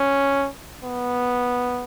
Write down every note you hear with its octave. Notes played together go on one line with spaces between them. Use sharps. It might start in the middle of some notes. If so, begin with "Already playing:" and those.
Already playing: C#4
B3